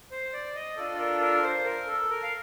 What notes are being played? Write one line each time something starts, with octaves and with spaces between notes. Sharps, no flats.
C5
D5
D#5
D4 F4 A4 D5
A#4
A#4
C5
A#4
A4
A#4
F5